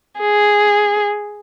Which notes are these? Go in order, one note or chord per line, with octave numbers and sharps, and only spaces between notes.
G#4